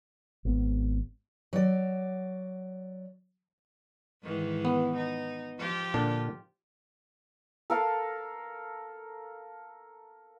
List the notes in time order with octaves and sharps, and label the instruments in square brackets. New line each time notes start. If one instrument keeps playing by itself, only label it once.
[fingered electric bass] G#1 B3
[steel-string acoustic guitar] F#3 D5
[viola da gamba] G#2 D#3 E3
[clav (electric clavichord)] B3
[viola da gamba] D#4
F3 F4 G4
[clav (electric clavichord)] A#2 D3 D4
[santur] A4 A#4 F5